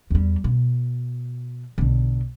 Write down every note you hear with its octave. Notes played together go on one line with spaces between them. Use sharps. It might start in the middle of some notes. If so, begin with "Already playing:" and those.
E2 G3
B2
B1 D3